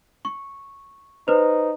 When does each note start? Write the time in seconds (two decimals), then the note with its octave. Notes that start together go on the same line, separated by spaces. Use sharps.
0.25 C#6
1.28 D#4 B4 C5